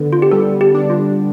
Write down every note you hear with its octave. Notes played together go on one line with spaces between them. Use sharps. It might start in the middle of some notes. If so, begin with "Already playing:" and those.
Already playing: D3 B3
F4
G4
G3 A4
G4
D4
F4